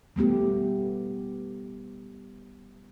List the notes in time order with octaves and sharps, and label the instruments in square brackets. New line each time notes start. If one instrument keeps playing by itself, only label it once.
[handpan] G3 A3 B3 G4